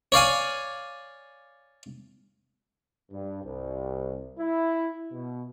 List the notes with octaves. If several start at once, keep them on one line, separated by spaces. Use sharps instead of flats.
C#5 D5 F5 G#5
G2
C2
E4
B2